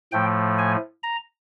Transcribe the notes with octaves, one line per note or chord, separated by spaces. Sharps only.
A2 F3 A3 G5
G#5
A#5